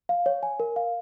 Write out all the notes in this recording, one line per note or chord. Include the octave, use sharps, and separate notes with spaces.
F5
C#5
G#5
A#4
F5